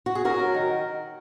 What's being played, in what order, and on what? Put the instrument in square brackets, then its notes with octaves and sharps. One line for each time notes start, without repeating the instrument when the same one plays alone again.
[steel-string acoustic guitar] F#4
G#4
C#4 F#4 A#4
F#3
D#3